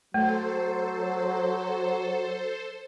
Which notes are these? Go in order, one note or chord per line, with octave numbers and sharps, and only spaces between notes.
F#3 A3 A4 C5